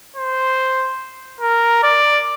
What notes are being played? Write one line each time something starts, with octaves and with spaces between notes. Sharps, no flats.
C5
A#4
D5